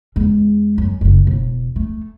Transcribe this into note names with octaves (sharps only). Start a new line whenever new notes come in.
E2 G#3
F#2
F#1 D3
E1
A3